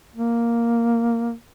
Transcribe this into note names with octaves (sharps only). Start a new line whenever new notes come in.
A#3